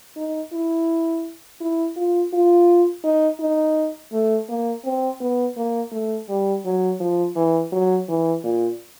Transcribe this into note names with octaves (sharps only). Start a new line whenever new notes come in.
D#4
E4
E4
F4
F4
D#4
D#4
A3
A#3
C4
B3
A#3
A3
G3
F#3
F3
E3
F#3
E3
A#2